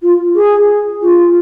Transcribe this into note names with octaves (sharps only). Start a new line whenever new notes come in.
F4
G#4
F4